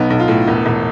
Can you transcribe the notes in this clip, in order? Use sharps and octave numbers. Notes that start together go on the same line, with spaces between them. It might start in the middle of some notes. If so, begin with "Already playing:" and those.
Already playing: B1 B3
B1
F4
A2
E1 B3
E1